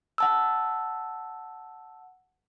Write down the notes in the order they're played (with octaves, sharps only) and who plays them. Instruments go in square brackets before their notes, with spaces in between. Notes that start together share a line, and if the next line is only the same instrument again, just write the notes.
[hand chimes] F#5 A5 E6